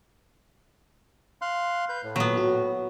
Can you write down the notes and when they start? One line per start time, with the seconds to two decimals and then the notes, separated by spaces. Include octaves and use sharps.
1.42 F5 C6 F#6
1.89 B4 G6
2.03 A2
2.16 A#2 F#3 B3
2.37 F#4